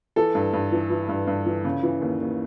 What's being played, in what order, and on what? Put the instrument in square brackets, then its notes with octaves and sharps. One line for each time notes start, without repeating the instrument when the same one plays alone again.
[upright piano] E3 A4
G2
G2
E3
E3
G2
G2
E3
C#3
E3
D#2
D#2